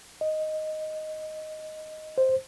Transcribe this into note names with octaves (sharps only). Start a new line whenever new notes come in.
D#5
C5